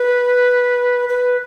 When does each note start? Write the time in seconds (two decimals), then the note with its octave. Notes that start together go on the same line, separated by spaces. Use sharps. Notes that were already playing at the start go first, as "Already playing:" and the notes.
Already playing: B4
1.09 B4